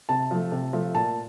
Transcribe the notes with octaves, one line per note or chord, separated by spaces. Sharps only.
C3 A5
F3 A3
C3
F3 A3
A#2 A5